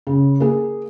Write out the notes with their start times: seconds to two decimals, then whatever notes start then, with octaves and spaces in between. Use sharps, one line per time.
0.07 C#3
0.40 A#3 G#4